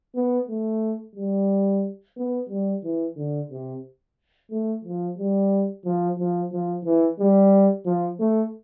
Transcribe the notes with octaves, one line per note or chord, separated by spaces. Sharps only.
B3
A3
G3
B3
G3
E3
D3
C3
A3
F3
G3
F3
F3
F3
E3
G3
F3
A3